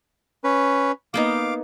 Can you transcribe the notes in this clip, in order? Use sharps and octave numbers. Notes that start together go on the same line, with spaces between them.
C#4 B4
A#3 B3 D#4 F5 D6